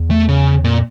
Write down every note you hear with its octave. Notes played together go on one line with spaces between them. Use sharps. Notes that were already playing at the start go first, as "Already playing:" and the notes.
Already playing: E2
A3
C#3
F2 A#2